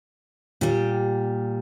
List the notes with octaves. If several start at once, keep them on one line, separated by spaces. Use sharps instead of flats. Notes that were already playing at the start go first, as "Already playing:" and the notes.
A#2 G3 G4